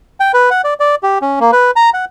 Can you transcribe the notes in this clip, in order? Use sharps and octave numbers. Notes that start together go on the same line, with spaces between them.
G5
B4
F#5
D5
D5
G4
C#4
A#3
B4
A#5
F#5